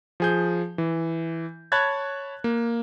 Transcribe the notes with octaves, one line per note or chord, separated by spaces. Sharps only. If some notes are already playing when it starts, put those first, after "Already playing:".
F3 G#4 G6
E3
C#5 A5 B5 F#6 G#6 A6
A#3